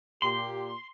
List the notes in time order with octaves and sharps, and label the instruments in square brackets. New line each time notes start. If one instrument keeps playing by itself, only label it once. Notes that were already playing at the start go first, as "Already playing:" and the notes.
[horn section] A#2 G4 [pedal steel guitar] C6